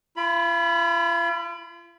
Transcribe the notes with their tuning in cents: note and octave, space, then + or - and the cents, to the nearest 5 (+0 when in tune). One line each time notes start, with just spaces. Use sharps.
F4 -40 B5 +0